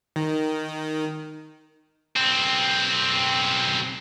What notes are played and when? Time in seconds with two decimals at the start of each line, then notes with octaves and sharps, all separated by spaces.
0.16 D#3
2.16 B1 C4